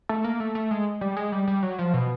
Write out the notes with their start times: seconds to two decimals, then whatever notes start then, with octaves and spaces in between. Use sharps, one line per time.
0.09 A3
0.24 A#3
0.40 A3
0.55 A3
0.71 G#3
1.01 G3
1.17 G#3
1.32 G3
1.47 G3
1.63 F#3
1.79 F3
1.94 B2